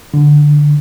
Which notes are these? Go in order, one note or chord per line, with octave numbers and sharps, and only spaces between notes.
D3